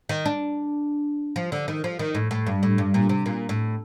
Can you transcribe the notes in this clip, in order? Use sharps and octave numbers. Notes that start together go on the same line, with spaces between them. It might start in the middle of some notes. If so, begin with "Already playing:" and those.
D#3
D4
F3
D3
D#3
F3
D#3
A2
A2
G2
A2
G2
A#2
C3
A#2
A2